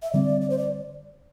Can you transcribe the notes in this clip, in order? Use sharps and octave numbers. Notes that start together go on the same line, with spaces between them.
E5
D3 G3 C4 D5
D5
C5
D5